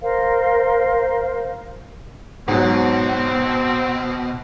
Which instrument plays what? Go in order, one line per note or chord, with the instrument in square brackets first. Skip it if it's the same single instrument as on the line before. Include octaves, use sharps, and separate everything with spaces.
[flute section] A#4 C5 F5
[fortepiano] G#2 F#3 [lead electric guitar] B2 [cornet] C4